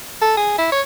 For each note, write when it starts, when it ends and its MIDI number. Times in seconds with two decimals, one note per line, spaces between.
0.22 0.34 69
0.37 0.56 68
0.58 0.68 64
0.72 0.81 73